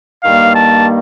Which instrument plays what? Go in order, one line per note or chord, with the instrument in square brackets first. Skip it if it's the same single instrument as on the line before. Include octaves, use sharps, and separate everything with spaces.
[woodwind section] G2 D#3 G3 A#3 [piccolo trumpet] F5
[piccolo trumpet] A5